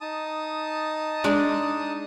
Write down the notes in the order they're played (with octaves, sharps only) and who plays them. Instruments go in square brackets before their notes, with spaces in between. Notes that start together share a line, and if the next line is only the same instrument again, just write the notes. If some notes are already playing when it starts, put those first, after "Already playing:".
[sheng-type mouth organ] D#4 A5 D#6
[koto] G#3 D4